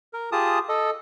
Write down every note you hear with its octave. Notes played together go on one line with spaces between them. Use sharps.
A#4
F4 G4 G#4 A5 D#6
A4 D#5